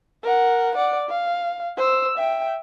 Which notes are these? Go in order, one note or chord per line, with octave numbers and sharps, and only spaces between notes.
A#4 F#5
D5 F#5
F5
C5 E6
E5 G5